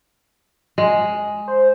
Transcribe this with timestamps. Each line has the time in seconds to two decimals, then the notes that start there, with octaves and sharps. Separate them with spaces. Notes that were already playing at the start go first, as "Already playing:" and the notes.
0.78 G#3
1.48 C5